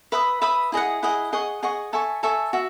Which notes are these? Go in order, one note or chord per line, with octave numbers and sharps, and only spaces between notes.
B4 E5 B5 D#6
B4 E5 B5 D#6
E4 G#4 D#5 F#5
E4 G#4 D#5 F#5
G#4 D#5 F#5 C#6
G#4 D#5 F#5 C#6
A4 E5 G#5 C#6
A4 E5 G#5 C#6
F#4 E5